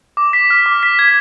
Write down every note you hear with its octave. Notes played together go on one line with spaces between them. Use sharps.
D6
B6
F6
D6
B6
G#6